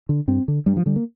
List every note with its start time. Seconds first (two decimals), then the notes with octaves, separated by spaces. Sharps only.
0.09 D3
0.28 G2 C4
0.48 D3
0.66 G2 G3
0.77 F3
0.86 D3 G3
0.96 A#3